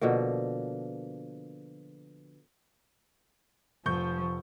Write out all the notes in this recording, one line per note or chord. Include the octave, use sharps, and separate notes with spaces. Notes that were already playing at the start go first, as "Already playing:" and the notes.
B2 D3 F3 A#3
F1 F3 C#6 G6